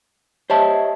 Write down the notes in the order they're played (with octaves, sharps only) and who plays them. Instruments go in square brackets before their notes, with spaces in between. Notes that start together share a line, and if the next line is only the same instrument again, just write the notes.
[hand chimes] G4 D#5 E5 [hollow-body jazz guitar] C5 C#5 A5